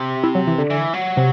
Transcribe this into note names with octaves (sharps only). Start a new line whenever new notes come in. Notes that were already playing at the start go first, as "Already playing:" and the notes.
Already playing: C3
E4
F#3
E3
D3
E3
F#3
C3